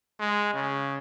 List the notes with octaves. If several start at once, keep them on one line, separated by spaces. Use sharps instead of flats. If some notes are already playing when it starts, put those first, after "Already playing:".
G#3
C#3